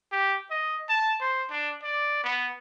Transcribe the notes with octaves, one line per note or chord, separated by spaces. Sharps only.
G4
D#5
A5
C5
D4
D5
B3